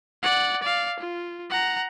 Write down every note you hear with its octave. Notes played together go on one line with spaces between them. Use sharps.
D5 F#5
D5 F5
F4
F#5 A#5